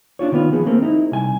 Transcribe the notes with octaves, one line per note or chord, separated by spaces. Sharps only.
D4 E4 F4 C#5
D#3 B3 F4
F3 B3 G#4
A3 A#3 C4
D#4 E4
C2 G#5